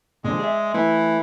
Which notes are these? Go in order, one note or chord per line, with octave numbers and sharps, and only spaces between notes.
A#2 D3 F3 G#3
G#4 D5 E5
E3 A3